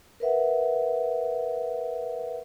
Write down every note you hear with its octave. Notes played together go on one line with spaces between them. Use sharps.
A#4 B4 E5 F#5